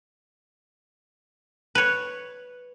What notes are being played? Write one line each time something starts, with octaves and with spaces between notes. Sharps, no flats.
B4 C#5